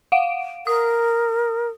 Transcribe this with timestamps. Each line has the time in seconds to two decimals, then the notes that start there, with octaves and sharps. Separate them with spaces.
0.12 F5 F#5 D7
0.67 A#4 D#6